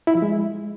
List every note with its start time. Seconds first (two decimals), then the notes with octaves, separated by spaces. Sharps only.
0.07 E4
0.15 F3
0.22 G#3